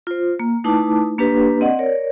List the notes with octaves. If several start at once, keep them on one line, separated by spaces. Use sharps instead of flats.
F4 C5
A#3
A3 D#4 E4 B4 A5 D6
A#3 D4 G4 B4
C4 D5 D#5 F#5
A#4 C#5 D5